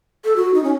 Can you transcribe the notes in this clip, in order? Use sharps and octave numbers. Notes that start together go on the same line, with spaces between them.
A4
F#4
D#4
C#4